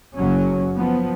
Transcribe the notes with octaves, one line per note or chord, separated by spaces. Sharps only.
F#1 F#3 C#4
F3 B3